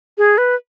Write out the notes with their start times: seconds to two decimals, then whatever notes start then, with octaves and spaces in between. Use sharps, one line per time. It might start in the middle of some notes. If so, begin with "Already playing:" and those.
0.18 G#4
0.38 B4